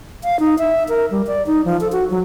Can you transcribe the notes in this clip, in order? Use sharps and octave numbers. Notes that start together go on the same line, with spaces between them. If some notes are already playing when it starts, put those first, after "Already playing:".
F5
D#4
E5
A#4
G3
D5
D#4
F3
A4
F#4
F#3